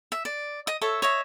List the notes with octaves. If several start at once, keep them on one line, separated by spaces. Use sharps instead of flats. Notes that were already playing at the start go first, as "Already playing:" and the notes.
E5
D5
D#5 D#6
A4 C#5 E5
C#5 D#5 E5